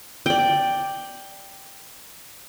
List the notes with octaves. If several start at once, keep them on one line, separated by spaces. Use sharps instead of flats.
D5 G5